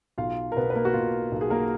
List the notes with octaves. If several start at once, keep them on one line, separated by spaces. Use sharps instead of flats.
B1 F4 F5
A#4
B2 B3 B4
B4
A#3 A#4
F#4
B2 F4
B1
G#4
A#3 A#4